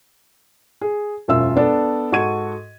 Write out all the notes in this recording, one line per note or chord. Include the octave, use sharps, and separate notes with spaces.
G#4
E1 F#2 F4 E5 E6
B3 D4 A4
G#2 F#4 A4 C#6 G#6 D#7